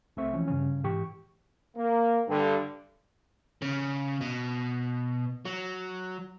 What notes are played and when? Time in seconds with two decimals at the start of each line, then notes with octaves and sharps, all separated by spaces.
0.17 C2 A3 C4 C5 E5 C#6
0.33 E3 F3 C#4
0.47 G2 C#3 C#4
0.83 G#2 E3 G4 C#6
1.76 A#3
2.28 G2 D3
3.62 C#3
4.21 B2
5.45 F#3